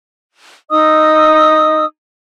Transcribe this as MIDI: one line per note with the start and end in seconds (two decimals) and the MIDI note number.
0.71 1.85 63
0.71 1.85 75
0.71 1.85 87
0.71 1.85 88